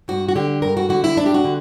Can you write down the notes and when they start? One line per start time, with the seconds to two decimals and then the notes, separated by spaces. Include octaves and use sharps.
0.08 G2 F#4
0.28 F#4
0.36 D3 G4
0.62 G2 A#4
0.77 F#4
0.89 D3 F#4
1.04 E4
1.16 G2 D4
1.26 G4
1.34 F#4
1.44 D3